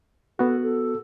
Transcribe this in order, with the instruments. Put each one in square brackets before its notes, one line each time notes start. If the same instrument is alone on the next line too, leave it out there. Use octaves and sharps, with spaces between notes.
[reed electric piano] B3 F#4 [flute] A4
[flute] A4